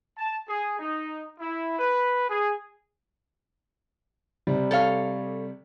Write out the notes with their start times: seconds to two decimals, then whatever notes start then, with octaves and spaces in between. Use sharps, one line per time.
0.18 A5
0.48 G#4
0.79 D#4
1.40 E4
1.79 B4
2.29 G#4
4.47 C3 G3
4.71 A4 C#5 F5